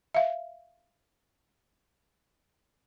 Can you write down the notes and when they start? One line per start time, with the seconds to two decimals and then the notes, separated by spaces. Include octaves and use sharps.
0.14 E5 F5